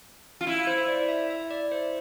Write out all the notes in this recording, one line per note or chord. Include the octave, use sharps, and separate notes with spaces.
F4
E4
C5
D5
E5
E5
D5
C5